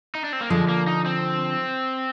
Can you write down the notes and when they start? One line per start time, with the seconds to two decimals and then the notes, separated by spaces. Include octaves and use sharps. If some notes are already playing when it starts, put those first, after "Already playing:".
0.15 D#4
0.24 D4
0.33 C4
0.41 A#3
0.50 D3 F3 G#3
0.69 A#3
0.87 D#4
1.06 C4